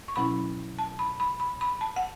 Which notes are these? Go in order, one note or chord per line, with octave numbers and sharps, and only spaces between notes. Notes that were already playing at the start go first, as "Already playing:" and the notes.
C#6
B2 F#3 C#4 E4 B5
A5
B5
B5
B5
B5
A5
F#5